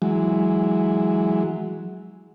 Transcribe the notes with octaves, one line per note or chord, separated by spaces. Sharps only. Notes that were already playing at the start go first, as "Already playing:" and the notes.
E3 F#3 G#3